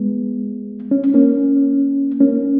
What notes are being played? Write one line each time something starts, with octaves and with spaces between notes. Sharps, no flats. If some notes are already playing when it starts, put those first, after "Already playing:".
Already playing: G#3 B3
C#4
A#3 C#4
A#3 C#4